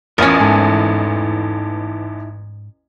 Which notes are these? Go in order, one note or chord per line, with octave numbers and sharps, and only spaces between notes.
A1 E2 E3 C#4 F4 A#4 G#5
G#2 D#4 E4 A4